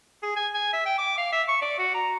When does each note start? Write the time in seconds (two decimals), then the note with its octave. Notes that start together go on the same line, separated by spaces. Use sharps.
0.23 G#4
0.36 G#5
0.55 G#5
0.73 E5
0.86 G5
0.98 D6
1.17 F5
1.32 E5
1.48 C#6
1.62 D5
1.78 F#4
1.94 A#5